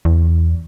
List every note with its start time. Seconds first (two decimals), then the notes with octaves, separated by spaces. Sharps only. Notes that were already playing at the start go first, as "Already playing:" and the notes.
0.05 E2